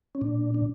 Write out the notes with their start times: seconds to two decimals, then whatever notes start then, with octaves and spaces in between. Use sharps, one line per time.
0.15 C#4
0.21 A#2 D4
0.54 D4